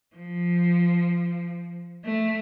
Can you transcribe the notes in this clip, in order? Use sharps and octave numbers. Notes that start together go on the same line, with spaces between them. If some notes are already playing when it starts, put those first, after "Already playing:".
F3
A3